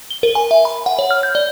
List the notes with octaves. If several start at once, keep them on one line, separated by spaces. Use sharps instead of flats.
G7
A#4
G#5
E5
B5
F#5
C#5
F6
G6
D5